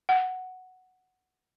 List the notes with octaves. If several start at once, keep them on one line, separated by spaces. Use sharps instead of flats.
F#5